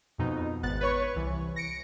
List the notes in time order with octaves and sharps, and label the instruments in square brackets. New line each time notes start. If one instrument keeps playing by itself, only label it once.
[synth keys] F2 B2 D#4
G#1 B3 F#6 A6
B4 C#5 C#6
C2 E3
A#6 C#7 D7